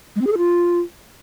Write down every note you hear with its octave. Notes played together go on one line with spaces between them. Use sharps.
G#3
C4
G#4
A4
F4